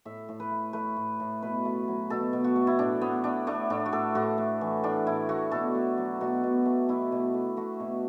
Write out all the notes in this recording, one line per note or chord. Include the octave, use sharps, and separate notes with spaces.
A2 E5
A2
B4
A3
A3 B4
A2
A2
B2 B4
A3
F#3
B2 A4
B2
F#4
A3
E4
A2 D4
A2 B3
A3 D4
A3 D4
A2 D4
F#4
A2 A4
A2 F#4
A3
E3
A2 D4
A2 E4
A3 F#4
B2 A4
A3
F#3
B2 F#4
B2
A3
B2 E4
B2
A3
A3 F#4
B2